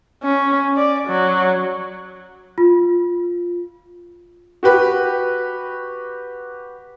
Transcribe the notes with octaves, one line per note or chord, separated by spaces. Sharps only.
C#4
D5
F#3
F4
F#4 G4 B4